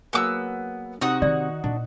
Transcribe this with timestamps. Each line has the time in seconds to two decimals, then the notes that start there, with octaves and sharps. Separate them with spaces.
0.13 F#3 A#3 B3 G#4 D6 E6
1.01 C3 D#4 F#4 D#6
1.22 D#3 D5
1.64 A#2 D4